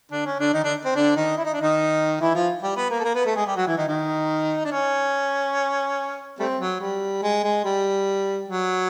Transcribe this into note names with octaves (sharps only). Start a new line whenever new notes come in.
D3 D4
C#4
D3 D4
D#3 D#4
D3 D4
C4
D3 D4
D#3 D#4
E4
D#4
D4
D#3 D#4
E3 E4
F3 F4
G3 G4
B3 B4
A#3 A#4
A4
A#3 A#4
B3 B4
A3 A4
G#3 G#4
G3 G4
F#3 F#4
E3 E4
D#3 D#4
D#3 D#4
D4
C#4
G3 A3 C4
F#3
G3
G#3
G#3
G3
F#3